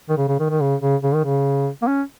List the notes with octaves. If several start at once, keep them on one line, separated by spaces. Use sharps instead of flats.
D#3
C#3
C#3
D#3
D#3
C#3
C#3
C#3
D#3
C#3
A#3
C#4